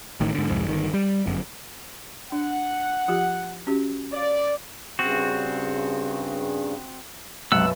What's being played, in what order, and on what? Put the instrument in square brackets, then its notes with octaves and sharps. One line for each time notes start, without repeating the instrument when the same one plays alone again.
[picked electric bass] A1 A2 D#3
G#2 D3
C2 F2 G#2
G1 D#3
G3
G1 F#2
[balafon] D4 [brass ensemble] F#5
[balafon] F3 F4 G4
C#4 F#4 G4
[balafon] C#5 F5 [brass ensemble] D5
[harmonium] G2 C#3 [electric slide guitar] C4 F#4
[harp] B1 F#2 [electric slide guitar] C3 G#3 F#5 [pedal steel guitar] E6